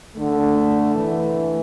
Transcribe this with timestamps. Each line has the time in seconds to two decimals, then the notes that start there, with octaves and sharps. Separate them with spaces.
0.19 D3 A3
0.95 E3